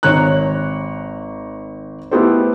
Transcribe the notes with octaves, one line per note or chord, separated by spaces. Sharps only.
G#1 C#5 A#5 F#6
A3 B3 E4 G4 A4 C5